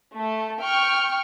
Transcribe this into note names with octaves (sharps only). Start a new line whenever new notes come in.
A3
G5 C#6 F6